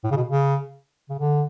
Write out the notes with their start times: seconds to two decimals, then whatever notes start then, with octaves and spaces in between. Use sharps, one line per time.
0.04 A2
0.11 C#3
0.17 B2
0.29 C#3
1.09 C#3
1.19 D3